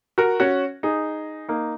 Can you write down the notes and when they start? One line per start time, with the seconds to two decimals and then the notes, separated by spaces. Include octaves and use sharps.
0.18 F#4 A#4
0.40 C#4 F#4
0.83 D#4 G#4
1.49 A#3 D#4